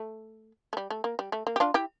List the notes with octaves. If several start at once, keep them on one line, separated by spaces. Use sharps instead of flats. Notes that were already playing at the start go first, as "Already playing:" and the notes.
Already playing: A3
A3
G3
A3
A#3
G3
A3
A#3
G4
D4 F4
E4 G4